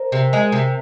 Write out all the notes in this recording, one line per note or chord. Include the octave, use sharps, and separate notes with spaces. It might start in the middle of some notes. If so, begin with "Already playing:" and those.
Already playing: A#4 C5
C3
G#3
C3